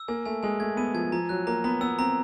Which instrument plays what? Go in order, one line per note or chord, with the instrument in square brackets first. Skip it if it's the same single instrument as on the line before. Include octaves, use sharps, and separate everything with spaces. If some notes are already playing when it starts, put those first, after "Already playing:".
Already playing: [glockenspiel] E6
[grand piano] A#3 [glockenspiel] G#5
[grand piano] A3 [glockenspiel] G#5
[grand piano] G#3 [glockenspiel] G#5
[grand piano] A3 [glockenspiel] G#6
[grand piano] B3 [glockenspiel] D#7
[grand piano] F3 [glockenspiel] G#6
[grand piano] F3 [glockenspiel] A#5
[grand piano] F#3 [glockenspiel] F#6
[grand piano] A#3 [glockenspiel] A#5
[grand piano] B3 [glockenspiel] A#5
[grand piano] B3 [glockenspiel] E6
[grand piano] C4 [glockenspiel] A#5